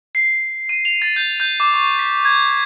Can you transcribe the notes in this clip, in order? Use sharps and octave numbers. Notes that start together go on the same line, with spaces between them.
C7
D#7
F7
A6
G6
G6
D6
C#6
B6
G#6